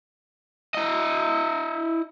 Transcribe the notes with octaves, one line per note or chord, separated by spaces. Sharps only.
E4 D#5